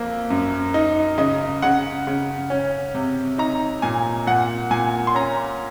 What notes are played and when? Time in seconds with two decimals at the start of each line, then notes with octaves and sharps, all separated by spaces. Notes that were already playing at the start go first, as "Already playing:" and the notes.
Already playing: F2 A#3
0.30 F#2
0.74 D#4
1.18 C#3 D#5
1.62 C#3 F#5
2.07 C#3
2.50 C#4
2.95 C3
3.38 D#4 A#5
3.82 A#2 G#5
4.27 A#2 F#5
4.70 A#2 G#5
5.07 C6
5.15 C#4 A#5